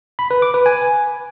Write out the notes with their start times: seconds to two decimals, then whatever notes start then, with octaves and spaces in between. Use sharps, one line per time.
0.19 B5
0.31 B4
0.42 D6
0.54 B4
0.66 G#5